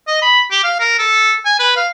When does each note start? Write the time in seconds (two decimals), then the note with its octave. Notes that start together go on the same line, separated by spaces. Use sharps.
0.07 D#5
0.22 B5
0.51 G4
0.64 F5
0.80 A#4
0.99 A4
1.46 G#5
1.60 B4
1.77 F5